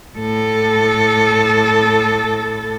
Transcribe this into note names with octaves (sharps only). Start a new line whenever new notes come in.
A2 A4